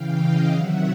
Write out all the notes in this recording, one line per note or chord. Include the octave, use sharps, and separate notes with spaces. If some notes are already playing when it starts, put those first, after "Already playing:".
Already playing: C#3 E3 F5 G5
D#5 F5
C3 D#3 F#3 E5 F#5